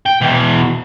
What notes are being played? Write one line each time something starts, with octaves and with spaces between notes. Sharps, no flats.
G5
B2 E3